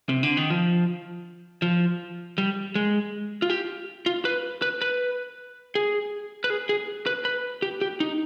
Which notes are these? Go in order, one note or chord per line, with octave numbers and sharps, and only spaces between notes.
C3
D3
D#3
F3
F3
G3
G#3
F4
G4
F4
B4
B4
B4
G#4
B4
G#4
G#4
B4
B4
G4
G4
D#4